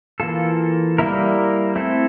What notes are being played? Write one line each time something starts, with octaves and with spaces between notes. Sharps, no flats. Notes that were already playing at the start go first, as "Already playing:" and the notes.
E3 A#3 F4 A4
G3 A#3 E4 A#4
A3 C4 E4 A4